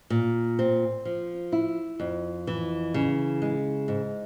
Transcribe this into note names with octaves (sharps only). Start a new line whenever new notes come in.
A#2
C4
F3
E4
F2
E3
C#3
G#3
G#2